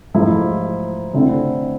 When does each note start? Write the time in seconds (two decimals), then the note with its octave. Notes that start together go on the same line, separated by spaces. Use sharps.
0.14 G#2 F3 A3 E4
1.13 D3 A3 C4 E4